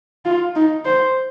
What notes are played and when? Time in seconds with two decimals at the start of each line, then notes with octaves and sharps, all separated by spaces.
0.25 F4
0.55 D#4
0.85 C5